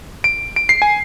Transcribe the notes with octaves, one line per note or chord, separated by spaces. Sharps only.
D7
D7
C7
G#5